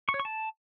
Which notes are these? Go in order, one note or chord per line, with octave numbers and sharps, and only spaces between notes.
C#6
C#5
C#6
A5